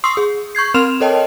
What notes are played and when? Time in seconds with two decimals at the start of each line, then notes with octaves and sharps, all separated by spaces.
0.04 C6 C#6 D#6 E6 C7
0.17 G#4
0.55 C#6 G6 G#6 C7
0.74 C4 A#4 C6 F6 E7 F7
1.00 A4 A#4 C#5 D#5 G5 A5